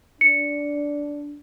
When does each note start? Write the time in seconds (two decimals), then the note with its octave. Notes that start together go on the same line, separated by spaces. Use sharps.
0.21 D4 C#7